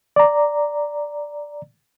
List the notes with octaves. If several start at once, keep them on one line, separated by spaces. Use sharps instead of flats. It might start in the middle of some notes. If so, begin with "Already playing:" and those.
D5 A#5